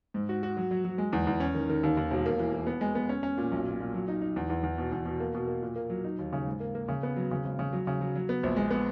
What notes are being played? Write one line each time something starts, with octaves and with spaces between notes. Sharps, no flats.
G#2
F#4
F#4
F#3
F#3
F#3
G#3
E2
E2
C#4
D#3
D#3
D#2
D#2
E1
A#3
E3
E3
B3
G#3
B3
C#4
C#4
A#2
B1
A#2
A#2
F#3
D#4
D#4
E2
E2
E2
B2
E2
B2
A#3
B2
A#3
A#2
A#3
F#3
D#4
D#2
C#3
G#2
A#3
A#3
C#3
B3
F#3
C#3
G#1
C#3
F#3
C#3
F#3
F#3
B3
A#1
G#3
B3